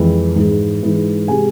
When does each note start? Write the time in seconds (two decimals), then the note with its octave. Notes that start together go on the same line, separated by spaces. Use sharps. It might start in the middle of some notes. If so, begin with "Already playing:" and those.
Already playing: F2 E3 G#3
0.36 G#2 E3 G#3
0.83 G#2 E3 G#3
1.28 C3 G#3 G#5